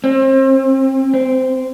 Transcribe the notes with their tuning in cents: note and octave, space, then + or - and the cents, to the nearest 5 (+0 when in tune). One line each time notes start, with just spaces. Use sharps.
C4 +35
C4 -15